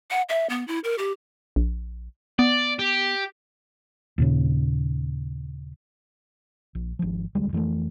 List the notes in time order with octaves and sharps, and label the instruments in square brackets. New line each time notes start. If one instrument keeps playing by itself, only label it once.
[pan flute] F#5
E5
B3
E4
A#4
G4
[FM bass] A#1
[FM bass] B3 [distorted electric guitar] D5
[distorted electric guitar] G4
[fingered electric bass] D#2 A#2 C#3
A#1
G#1 F3
D#1 D2 G3 G#3
F2 E3 F#3 A3